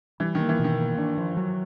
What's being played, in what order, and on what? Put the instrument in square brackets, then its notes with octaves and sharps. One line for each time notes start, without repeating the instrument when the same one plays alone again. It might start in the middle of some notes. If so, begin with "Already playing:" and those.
[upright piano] E3 [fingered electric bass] G3
[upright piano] D#3
[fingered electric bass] A#3
[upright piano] E3
[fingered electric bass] B2 [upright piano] D#3
[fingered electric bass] A#3
D4
F3
F#3